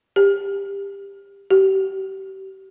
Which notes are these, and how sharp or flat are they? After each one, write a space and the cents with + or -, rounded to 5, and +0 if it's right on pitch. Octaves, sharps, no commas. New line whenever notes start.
G4 +20
G4 -30